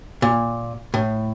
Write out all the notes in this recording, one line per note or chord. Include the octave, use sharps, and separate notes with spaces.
A#2
A2